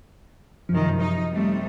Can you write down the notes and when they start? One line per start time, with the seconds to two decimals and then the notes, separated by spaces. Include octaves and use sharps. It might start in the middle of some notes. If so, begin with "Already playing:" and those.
0.69 F#2 C3 D#3 F3
1.00 D#4
1.32 C3 G3 A3